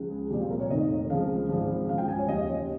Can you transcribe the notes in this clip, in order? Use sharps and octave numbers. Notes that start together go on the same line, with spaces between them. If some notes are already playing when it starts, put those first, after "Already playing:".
Already playing: C#2 C#3 F3
G#4
C2 A#2 F3 G4
F4
A#4
C#5
F1 F2 D#3 D#5
C#2 C#3 F3 F5
G#1 G#2 F3
C#2 C#3 F3 F5
G5
G#5
C#5
D#2 C#3 F3 D#5
C#5